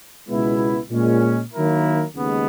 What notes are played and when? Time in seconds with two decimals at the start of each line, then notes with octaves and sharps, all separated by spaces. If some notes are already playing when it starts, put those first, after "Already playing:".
0.29 C#2 B2 G#3 B3 E4
0.91 A#2 G#3 C#4
1.53 D#3 F#3 A#3 E4 A#4
2.15 D#2 C#3 G#3 B3